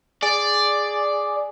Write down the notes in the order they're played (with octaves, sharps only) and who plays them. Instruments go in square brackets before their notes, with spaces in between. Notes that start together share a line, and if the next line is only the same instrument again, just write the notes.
[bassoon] G#4 [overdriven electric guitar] D5